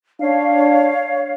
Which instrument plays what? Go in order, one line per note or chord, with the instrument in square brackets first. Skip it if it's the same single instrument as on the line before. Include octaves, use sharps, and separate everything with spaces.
[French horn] D4 [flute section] C#5 F5